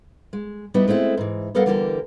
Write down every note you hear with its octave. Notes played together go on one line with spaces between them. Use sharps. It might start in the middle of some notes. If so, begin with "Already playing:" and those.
G#3
G3 B3 D#4 E4
G#3 A3 C4 E4
G#2 E3
G3 B3 A4 A#4 F5 F#5
D3 E3 G3 A#3 A4 A#4